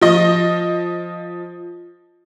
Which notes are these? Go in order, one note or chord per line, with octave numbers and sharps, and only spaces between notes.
F3 D#5